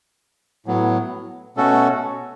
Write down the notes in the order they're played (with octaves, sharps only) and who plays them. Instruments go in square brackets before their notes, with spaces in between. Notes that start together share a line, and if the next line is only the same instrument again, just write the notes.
[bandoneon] A2 F#3 B3
B2 A3 C#4 F#4 A4